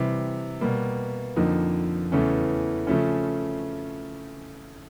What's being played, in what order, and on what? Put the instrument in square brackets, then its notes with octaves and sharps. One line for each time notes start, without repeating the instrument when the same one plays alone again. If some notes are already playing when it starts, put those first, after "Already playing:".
Already playing: [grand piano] C3 E3 G3
B2 G3 A#3
F2 D3 F3 A#3 D#4
E2 C#3 E3 A3 C#4
C#3 F3 A3 C#4